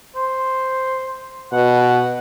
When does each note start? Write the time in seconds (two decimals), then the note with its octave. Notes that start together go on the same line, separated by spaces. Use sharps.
0.16 C5
1.53 B2 F#5